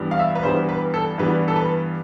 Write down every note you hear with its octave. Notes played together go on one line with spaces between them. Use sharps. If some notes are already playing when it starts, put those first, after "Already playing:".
Already playing: G2 E3 G3 B3
F5
E5
B4
G2 E3 G3 B3 C5
B4
A4
G2 E3 G3 B3 B4
A4
B4